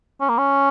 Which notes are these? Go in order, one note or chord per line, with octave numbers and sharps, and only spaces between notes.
C#4
A#3
C#4